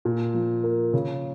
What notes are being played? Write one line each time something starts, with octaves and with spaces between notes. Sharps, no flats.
A#2
F3
A#3
C#3